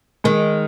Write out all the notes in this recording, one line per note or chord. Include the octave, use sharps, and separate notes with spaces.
D#3 G#3